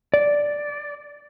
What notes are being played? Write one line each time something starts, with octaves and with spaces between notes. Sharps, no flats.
D5